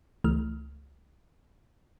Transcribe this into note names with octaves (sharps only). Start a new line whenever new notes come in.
C#2 E3 A3 F6